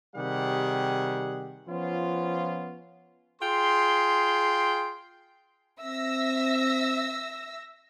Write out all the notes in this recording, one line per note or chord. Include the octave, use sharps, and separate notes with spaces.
C3 D#3 G3 G4 G#4 F#5
F3 B3 C#4 F4
F4 G#4 G5 C6
C4 E5 E6 A#6